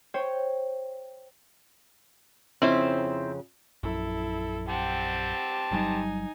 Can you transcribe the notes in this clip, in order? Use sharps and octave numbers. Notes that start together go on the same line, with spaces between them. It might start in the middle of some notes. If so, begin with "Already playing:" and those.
C5 C#5 G5
F2 C#3 C4 C#4 E4 C5
A#1 F#2 E4 A4
C4 G4 F#5 A5
G1 F#3 G3 D#4 G#5